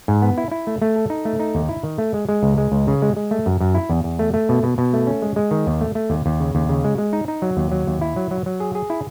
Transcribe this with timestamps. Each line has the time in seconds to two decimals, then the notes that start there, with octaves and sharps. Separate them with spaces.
0.08 G#2
0.22 B3
0.38 E4
0.52 E4
0.67 A3
0.82 A3
0.96 A4
1.10 D#4
1.25 A3
1.40 D#4
1.55 D#2
1.69 E4
1.84 D#3
1.98 A3
2.14 G#3
2.29 G#3
2.43 C#2
2.58 G#3
2.72 C#2
2.88 C#3
3.02 G#3
3.17 G#3
3.31 A3
3.46 F#2
3.61 F#2
3.75 E4
3.90 E2
4.04 E2
4.19 A3
4.34 A3
4.49 B2
4.63 B2
4.78 B2
4.93 A3
5.07 C#4
5.22 G#3
5.36 G#3
5.51 D#3
5.67 D#2
5.81 A3
5.95 A3
6.10 D#2
6.26 D#2
6.40 C#3
6.55 D#2
6.69 C#3
6.84 G#3
6.98 G#3
7.13 D#4
7.28 D#4
7.42 F#3
7.57 D#2
7.72 F#3
7.87 D#2
8.01 E4
8.16 F#3
8.31 F#3
8.46 F#3
8.60 G#4
8.75 G#4
8.90 E4